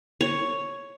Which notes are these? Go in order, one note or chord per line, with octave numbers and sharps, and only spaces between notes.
C#5